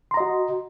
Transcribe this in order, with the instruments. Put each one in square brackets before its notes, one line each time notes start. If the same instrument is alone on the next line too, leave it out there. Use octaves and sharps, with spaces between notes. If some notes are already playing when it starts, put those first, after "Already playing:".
[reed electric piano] C6
A#5
D#5
F#4